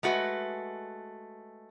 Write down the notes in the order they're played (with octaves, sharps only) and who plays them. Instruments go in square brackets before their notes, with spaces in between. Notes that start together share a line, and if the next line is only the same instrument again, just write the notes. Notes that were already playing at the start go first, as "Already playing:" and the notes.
[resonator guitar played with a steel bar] G#3 A3 F#4 B4